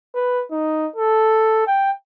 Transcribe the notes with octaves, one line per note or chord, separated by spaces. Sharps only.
B4
D#4
A4
G5